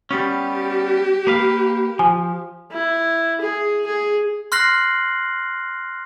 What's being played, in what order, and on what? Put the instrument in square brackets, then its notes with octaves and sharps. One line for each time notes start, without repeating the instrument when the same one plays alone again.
[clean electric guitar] G3 B3 C#4 [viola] G4
[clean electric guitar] A#3 B4 F5
[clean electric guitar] F3 [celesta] G#5
[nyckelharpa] E4
G#4
G#4
[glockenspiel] C6 F6 F#6 A#6 C7 F#7